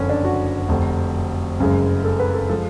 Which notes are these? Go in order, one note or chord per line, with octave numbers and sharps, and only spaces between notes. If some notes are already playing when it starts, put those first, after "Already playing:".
Already playing: F#1 F2 D3 C#4
D4
F#4
F1 F2 D3
F#1 F#2 C#3 G#3
A4
B4
A4
F3 G#3 A4